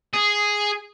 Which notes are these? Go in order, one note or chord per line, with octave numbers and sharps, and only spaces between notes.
G#4